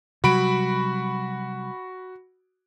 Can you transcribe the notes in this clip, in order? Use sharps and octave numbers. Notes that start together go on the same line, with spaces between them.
C3 F#3 G3 F#4 B5 D7